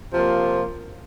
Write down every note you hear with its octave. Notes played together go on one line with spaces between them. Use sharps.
C3 F3 A#3 F4